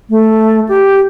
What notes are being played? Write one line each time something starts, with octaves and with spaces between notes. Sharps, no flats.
A3
G4